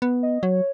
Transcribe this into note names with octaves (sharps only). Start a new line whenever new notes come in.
B3
D#5
F#3 C#5